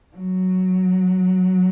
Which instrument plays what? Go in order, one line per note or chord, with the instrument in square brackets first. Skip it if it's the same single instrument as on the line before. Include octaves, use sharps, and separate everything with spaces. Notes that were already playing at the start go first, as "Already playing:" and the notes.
[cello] F#3